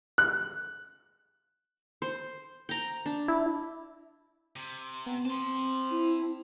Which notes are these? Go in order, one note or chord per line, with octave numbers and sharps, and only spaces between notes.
F#6
C5
G5 A#5
D4
E4
C3
B3
C4 A5 C6
E4